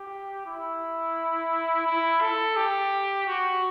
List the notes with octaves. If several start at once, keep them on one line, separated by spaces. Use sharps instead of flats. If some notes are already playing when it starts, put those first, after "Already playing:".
Already playing: G4
E4
E4
A4
G4
F#4